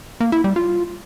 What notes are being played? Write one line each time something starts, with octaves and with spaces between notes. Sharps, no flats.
A#3
E4
G3
F4